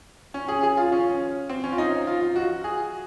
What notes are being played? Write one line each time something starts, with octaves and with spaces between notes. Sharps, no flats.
C#4
G#4
G#4
F4
C#4
C4
C#4
F4
D#4
F4
F4
F#4
G#4